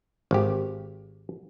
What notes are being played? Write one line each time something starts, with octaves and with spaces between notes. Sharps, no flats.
G#1 G4